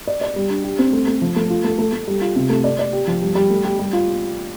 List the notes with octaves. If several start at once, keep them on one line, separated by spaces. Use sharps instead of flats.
D5
D5
G3
D4
G4
C4
A3
A3
F3
A3
F4
A3
A3
A3
G3
F4
C3
A3
D5
D5
G4
F3
G3
G3
A3
G4
G3
F4